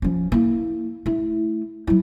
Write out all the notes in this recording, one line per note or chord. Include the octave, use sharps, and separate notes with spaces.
F3 C#4
A#3 E4
A3 E4
F#3 E4